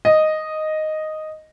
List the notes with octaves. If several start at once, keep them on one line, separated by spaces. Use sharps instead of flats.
D#5